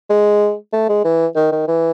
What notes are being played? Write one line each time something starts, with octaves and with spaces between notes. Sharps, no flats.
G#3
A3
G#3
E3
D#3
D#3
E3